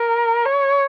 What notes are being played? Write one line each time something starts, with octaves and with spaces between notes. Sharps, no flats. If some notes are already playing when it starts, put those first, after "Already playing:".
Already playing: A#4
C#5